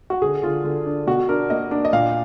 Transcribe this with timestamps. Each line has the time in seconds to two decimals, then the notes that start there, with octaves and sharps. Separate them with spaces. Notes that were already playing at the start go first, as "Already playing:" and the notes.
0.10 F#4
0.22 D3 G#4
0.43 D3 F4
0.64 D3
0.86 D4
1.07 B2 F#4
1.29 D4 A#4
1.50 A#3 D#5
1.71 D4
1.85 D#5
1.93 A#2 F5